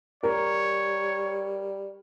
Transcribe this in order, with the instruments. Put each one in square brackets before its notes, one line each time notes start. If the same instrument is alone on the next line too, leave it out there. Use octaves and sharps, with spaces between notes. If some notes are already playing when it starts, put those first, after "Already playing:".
[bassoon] G3 [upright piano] A#4 [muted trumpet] C#5